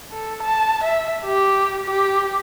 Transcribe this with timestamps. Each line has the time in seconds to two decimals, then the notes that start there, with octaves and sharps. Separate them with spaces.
0.12 A4
0.43 A5
0.84 E5
1.25 G4
1.85 G4